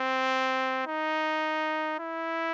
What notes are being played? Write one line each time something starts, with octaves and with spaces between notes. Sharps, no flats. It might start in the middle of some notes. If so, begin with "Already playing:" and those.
Already playing: C4
D#4
E4